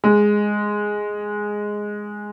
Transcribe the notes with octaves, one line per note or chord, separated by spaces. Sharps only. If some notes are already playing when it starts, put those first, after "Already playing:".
G#3